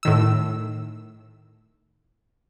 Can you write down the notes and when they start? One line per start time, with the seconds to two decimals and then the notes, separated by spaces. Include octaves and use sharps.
0.03 A2 D#3 E6